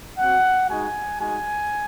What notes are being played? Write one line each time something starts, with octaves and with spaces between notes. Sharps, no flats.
C4 F#4 F#5
G#3 D#4 F#4 G#5
G#3 D#4 F#4 G#5